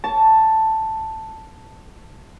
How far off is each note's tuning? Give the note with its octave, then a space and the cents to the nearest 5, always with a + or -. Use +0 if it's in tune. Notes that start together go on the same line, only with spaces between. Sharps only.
A5 +5 C#6 +30